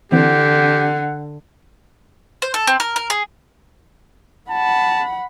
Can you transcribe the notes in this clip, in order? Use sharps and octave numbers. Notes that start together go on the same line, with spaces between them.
D3 E3 C4 G4 F#5
C5
A4
C4
A#4
A#4
G#4
F#5 A5 B5